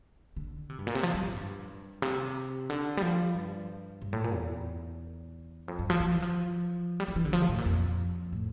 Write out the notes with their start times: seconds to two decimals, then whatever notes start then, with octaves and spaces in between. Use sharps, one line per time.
0.36 D3
0.70 C3
0.79 G2
0.87 A#2
0.95 C3
1.03 F3
1.14 G3
1.26 A2
1.36 G2
2.02 C3
2.70 D3
2.97 G3
3.02 F3
3.35 G2
4.02 G2
4.13 A2
4.24 A#2
4.35 E2
5.68 F2
5.79 G2
5.90 F3
6.00 F3
6.12 E3
6.22 F3
7.00 G3
7.08 F3
7.16 E3
7.25 D3
7.33 F3
7.42 C3
7.49 A2
7.58 A#2
7.66 F2
8.33 A2